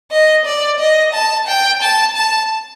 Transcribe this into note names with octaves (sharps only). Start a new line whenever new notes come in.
D#5
D5
D#5
A5
G5
A5
A5